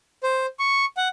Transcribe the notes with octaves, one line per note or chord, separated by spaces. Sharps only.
C5
C#6
F#5